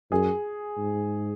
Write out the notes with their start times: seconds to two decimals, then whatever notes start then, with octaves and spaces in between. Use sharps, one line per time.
0.11 F#2 G#4
0.78 G#2